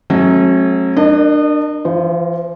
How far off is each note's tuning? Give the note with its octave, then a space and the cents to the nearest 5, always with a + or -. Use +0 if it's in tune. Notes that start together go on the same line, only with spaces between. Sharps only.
F#3 +0 A3 -30 C#4 -40
D4 +25 A#4 +0 D#5 -30
E3 +40 F4 +0 C5 +0